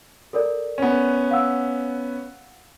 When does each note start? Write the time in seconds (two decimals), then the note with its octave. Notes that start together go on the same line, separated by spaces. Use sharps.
0.33 A4 A#4 D5
0.78 B3 C#4
1.31 F5 F#5 E6